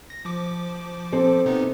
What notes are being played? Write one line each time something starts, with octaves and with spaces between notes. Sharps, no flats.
A#6
F3 D6
C4 A4
C3 B3 D#4